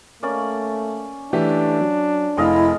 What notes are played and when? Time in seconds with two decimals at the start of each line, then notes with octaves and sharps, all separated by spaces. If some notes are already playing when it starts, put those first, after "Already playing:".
0.23 A3 A#3 C#4 D5
1.33 E3 A3 D4 G4
1.81 F#3
2.37 F1 G#3 E4 D#5 F5